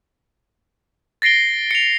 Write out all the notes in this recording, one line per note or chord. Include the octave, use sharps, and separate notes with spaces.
A6 A#6 C7 D7 G7
C#7 F7